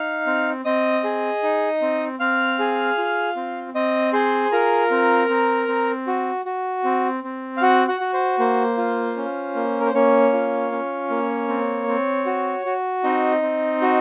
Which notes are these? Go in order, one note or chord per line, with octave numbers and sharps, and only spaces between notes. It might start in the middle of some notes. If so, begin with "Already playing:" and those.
Already playing: D#4 F5 F6
C4
C4 D#5 D#6
G#4
D#4
C4
C4 F5 F6
G#4
F4
C4
C4 D#5 D#6
G#4 C5 C6
F4 A#4 A#5
C4
C4
C4
F#4
F#4
C4
C4
F5
F#4 F#5
F#4 F#5
F#4
C5
A#3 C5
F4
C#4
A#3
A#4
C5
A#3 C#4 C#5
F4
C#4
A#3
C4
C4
F#4
F#4
C4 D#4 D#5
C4
F#4